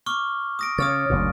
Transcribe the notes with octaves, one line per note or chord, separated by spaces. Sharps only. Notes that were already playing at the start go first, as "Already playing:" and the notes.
C#6 D6 F6
D#6 A#6 D7
C#3 C#5 D#6 F6 A6
F#1 D2 A#2